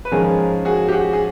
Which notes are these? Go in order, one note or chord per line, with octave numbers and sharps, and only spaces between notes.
B4
G#2 F3 G#3 C#4 G#4 A#4
F#4 G#4
G4
F#4 G#4
G#4